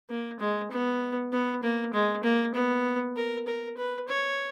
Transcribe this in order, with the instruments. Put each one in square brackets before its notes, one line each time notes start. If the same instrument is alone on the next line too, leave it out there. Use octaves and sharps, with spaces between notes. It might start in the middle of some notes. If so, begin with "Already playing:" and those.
[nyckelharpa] A#3
G#3
B3
B3
A#3
G#3
A#3
B3
A#4
A#4
B4
C#5